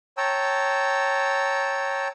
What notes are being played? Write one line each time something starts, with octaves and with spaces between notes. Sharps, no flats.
C#5 G5 A5 A#5 E6